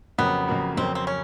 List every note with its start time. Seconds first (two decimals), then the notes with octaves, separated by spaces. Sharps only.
0.18 F2 C#3 F#3 A#3 B3
0.48 F2 C#3 F#3 A#3
0.77 F2 C#3 F#3 A#3 C4
0.95 C4
1.07 C#4